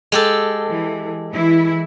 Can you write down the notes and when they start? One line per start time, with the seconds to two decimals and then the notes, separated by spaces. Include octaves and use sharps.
0.12 G#3 G4 A4
0.70 E3
1.32 E3 E4